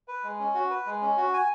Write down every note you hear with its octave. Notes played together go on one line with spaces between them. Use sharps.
B4
G#3
C#4
F#4
B4
G#3
C#4
F#4
G#5